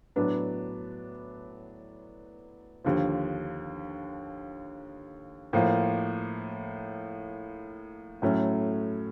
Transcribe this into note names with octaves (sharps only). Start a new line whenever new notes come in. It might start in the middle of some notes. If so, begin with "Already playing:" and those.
A2 F#3 B3 D4
D#2 D3 F3
A2 F3 A#3
A2 F#3 A3 C#4